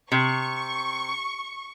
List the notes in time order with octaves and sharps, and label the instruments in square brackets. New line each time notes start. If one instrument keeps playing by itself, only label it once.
[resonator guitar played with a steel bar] C3 [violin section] C#6